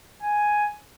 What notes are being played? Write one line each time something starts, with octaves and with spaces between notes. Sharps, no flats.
G#5